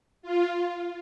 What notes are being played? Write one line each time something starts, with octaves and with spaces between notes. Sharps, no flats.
F4